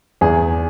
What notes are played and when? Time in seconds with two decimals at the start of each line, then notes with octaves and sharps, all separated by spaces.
0.21 E2 G#4